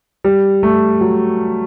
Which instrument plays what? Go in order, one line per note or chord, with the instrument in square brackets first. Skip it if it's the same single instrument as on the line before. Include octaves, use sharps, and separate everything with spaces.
[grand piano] G3
A3
F#3